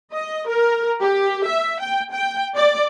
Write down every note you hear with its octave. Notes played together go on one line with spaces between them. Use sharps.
D#5
A#4
G4
E5
G5
G5
D5